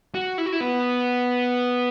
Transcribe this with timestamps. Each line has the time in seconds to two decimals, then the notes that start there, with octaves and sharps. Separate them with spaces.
0.15 F#4
0.38 E4
0.46 F#4
0.53 E4
0.61 B3